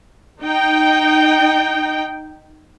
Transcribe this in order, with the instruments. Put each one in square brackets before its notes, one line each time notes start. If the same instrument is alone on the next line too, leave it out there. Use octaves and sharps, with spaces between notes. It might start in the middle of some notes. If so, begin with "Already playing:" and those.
[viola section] D#4 G5